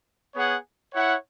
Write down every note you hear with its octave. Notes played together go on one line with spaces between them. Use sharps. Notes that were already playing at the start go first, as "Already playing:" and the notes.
B3 G#4 C#5 F#5
E4 C#5 F#5